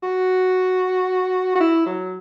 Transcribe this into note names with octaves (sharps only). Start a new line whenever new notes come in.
F#4
F#4
E4
F#3